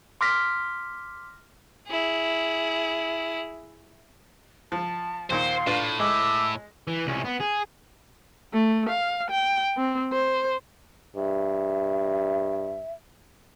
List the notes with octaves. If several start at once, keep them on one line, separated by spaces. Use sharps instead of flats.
C6 D6 F6 A#6 B6
E4 G#4
F3 A5
D#2 A#2 D#3 C5 F5 C6
A2 D4 F4 B4
G#3 E5 D6
E3
C2 C#4
B3
G#4
A3
F5
G5
C4
C5
G2 E5